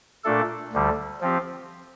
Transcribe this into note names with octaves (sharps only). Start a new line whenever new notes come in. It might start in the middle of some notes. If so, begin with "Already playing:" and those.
A#2 A3 D4 A4
D2 D3 G3
F3 C4 G4